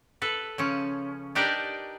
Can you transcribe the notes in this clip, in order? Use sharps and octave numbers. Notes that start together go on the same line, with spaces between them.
A4 B4
C#3 F3 C#4
D4 D#4 G4 A#4 B4 D5